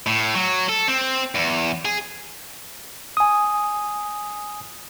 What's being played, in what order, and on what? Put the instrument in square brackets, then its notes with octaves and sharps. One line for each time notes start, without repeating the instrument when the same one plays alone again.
[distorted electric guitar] A2
F#3
A4
C4
E2
G#4
[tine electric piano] G#5 D#6